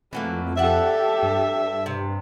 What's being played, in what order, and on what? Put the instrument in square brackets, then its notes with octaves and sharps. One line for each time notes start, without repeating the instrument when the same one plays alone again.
[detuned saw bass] F2 [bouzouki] E3 F#3 A#3 [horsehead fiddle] A3
[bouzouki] D4 F#5 [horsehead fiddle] G4 A4 [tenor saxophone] E5
[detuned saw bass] G2
[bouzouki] C3